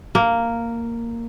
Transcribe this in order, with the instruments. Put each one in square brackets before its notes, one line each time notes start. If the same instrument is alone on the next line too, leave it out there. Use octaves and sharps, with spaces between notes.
[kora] A#3